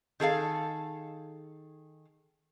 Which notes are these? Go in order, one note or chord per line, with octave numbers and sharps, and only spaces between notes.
D#3 G#4 A4 F5